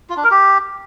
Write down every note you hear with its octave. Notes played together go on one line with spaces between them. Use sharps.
F4
D4
A#4
G4